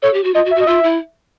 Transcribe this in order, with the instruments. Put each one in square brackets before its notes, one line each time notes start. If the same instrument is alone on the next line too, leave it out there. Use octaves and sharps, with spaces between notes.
[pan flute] A4 [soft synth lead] C#5
[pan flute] G4
F#4
[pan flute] F4 [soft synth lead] D#5
[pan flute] F#4
[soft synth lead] E5
[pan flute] F#4
[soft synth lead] D#5
[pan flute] F4 [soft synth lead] E5
[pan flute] E4